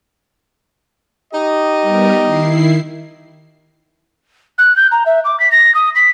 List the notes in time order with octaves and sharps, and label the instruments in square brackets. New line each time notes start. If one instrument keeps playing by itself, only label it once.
[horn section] D#4 G4 D#5
[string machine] G3 B3 A#4
D#3 E4 C7
[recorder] F#6
G6
A#5
E5
D6
B6
A#6
D#6
B6